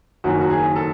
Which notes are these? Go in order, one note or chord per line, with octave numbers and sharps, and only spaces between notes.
F#1 F#2 D#3 F#3 F#4
F#4
G#4
A4